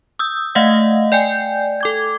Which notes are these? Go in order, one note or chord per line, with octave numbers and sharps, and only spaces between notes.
D#6 E6 G6
A3 D#5 F5 F#5
D5 G5 G#5 G6
A4 D6 G#6